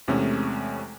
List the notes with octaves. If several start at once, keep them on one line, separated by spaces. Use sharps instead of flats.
E2 C3 G#3 A3 C#4